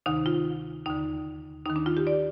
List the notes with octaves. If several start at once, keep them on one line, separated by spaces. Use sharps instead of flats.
D2 C3 D#3 D#4
F4
D#2 D3 D#4
D#2 D#3 D#4
D4
F4
G4
D5